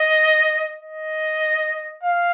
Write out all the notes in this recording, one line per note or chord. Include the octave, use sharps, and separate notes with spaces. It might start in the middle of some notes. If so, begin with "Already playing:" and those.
Already playing: D#5
D#5
F5